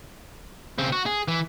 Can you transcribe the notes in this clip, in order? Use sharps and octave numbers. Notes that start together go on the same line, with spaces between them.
C#3 C4
F#4
G#4
E3